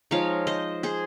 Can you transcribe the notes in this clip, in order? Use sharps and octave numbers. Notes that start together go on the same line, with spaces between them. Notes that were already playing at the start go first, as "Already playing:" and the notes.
F3 G#3 D#4 C#5 F5
C5 D#5
G#4 C5